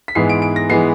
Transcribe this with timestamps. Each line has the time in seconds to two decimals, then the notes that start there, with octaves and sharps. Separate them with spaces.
0.08 B6
0.15 G#2 E3 G#3 B3 C7
0.29 D7
0.42 D7
0.56 A#6
0.69 E3 G#3 B3 C7